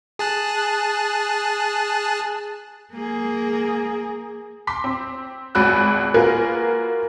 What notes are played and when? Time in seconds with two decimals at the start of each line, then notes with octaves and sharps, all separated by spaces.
0.19 G#4 A5 F#6
2.93 A#3 G#4
4.67 C6 D6 B6
4.84 C4
5.55 G#1 C#2 F#4 B5 E6 F#6
6.14 A#3 F4 F#4 G#4 A#4 B4